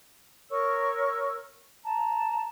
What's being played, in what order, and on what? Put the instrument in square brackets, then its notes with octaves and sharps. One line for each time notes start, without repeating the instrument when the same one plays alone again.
[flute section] A#4 C#5 C#6 E6
A5 A#5